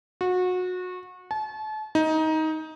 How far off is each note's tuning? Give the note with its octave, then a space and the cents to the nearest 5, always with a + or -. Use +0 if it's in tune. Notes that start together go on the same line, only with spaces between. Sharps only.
F#4 -25
A5 -35
D#4 +20